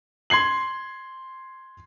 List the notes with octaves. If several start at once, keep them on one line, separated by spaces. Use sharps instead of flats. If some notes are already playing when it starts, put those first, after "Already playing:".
C6 G#6 C7 F#7